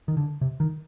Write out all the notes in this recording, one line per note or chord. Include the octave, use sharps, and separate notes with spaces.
D#3
D3
C3
D#3